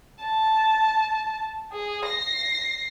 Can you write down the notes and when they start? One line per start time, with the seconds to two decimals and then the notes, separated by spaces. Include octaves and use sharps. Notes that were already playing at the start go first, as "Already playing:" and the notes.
0.22 A5
1.72 G#4
2.05 A#6 C7